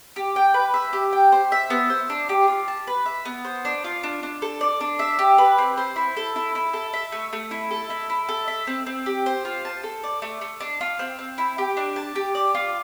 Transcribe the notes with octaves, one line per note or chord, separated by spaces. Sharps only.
G4
G5
B4
E5
G4
G5
C5
E5
B3
C5
D4
G4
F4
A5
B4
E5
B3
C5
D4
F4
D4
D4
A4
D5
D4
E5
G4
B4
C4
C5
E4
A4
E4
E4
A4
E5
A3
A3
E4
A4
E4
E4
A4
E5
C4
C4
G4
C5
F4
A5
A4
D5
A3
A3
D4
F4
C4
C4
E4
G4
D4
A5
G4
D5
F4